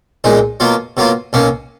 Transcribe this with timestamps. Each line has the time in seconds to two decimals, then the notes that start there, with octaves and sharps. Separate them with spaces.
0.24 B1 A#2 G#3 D#4
0.60 B2 F#3 A#3 F4
0.97 B2 F#3 A#3 F4
1.33 B1 B2 A#3 C#4